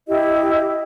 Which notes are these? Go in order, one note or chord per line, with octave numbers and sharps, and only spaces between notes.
E4 G4 D#5